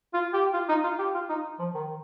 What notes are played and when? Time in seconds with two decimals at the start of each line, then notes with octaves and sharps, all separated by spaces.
0.14 F4
0.34 G4
0.54 F4
0.69 D#4
0.84 F4
0.99 G4
1.15 F4
1.29 D#4
1.59 F3
1.74 D#3